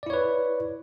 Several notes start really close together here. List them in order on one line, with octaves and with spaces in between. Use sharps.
D5 E4 C#5 B4